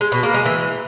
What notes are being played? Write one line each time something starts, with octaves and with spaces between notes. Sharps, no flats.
G#3
B2
A#3
G#3
E3